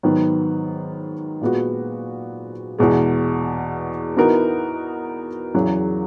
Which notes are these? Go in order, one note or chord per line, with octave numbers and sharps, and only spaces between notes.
G#2 D#3 F#3 B3
A#2 G#3 B3 F#4
E2 B2 G#3
E3 B3 D#4 F#4 A#4
E2 C#3 F#3